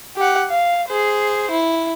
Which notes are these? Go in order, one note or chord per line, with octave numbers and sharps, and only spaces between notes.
G4 F#5
F5
G#4 C5
E4